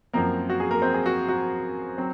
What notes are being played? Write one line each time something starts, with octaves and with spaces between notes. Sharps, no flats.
F#2 F3 A#3 C4 A#4
F#4
G#4
A#3 A#4
C4 C5
G#4
F#4
F#4
F#3 C4